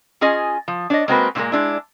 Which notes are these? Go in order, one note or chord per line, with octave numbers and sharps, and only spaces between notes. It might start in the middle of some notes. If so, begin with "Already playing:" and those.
C#4 F4 G#4 D#5 G#5
F3
D4 C#5 D#5
G#3 A#3 C4 F#4 A#4 B4
A#2 D#3 F3 G#3 A#3
G#3 D4 E4